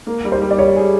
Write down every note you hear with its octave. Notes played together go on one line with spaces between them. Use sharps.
A#3
G3
C5
G3
D5
G3 C#5
G#4